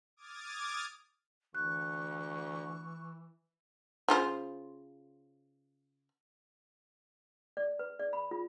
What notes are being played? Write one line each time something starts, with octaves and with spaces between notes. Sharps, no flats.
D6 D#6 F6 G#6 A6
D2 E3 C#6 F#6
C#3 F4 C5
D5
B4
D5
B5
F4